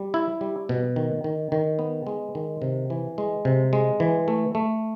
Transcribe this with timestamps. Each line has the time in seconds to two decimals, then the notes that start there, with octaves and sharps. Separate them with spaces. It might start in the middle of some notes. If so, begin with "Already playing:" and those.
Already playing: G3
0.14 E4
0.41 G3
0.69 B2
0.96 D#3
1.24 D#3
1.52 D#3
1.79 B3
2.07 G#3
2.35 D#3
2.62 C3
2.90 E3
3.18 G#3
3.45 C3
3.73 G#3
4.00 E3
4.28 A3
4.55 A3